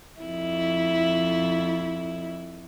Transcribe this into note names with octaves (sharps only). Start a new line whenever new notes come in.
F2 E4